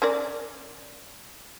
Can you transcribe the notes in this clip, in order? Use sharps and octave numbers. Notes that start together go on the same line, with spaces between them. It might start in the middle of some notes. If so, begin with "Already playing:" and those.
C#4 A#4 D5